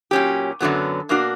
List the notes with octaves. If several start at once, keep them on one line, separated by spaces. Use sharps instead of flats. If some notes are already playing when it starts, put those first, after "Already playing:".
A#2 F#3 C#4 G4
F#2 D3 F#3 B3
B2 A#3 D4 F#4